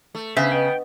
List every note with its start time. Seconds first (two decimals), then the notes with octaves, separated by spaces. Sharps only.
0.15 A3
0.37 C#3 B3 C5 E5
0.52 B4 D#5 G5